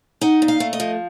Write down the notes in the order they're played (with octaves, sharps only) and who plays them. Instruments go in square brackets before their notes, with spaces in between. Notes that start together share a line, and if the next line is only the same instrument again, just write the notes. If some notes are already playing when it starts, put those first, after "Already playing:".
[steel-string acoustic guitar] D#4 F#5
A#2
F5
A3
D#5
F3